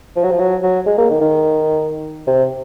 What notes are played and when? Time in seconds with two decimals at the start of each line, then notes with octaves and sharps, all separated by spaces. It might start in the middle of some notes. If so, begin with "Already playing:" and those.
0.16 F3
0.23 F#3
0.31 F3
0.39 F#3
0.63 F#3
0.86 G#3
0.98 A#3
1.10 D#3
1.21 D#3
2.27 C3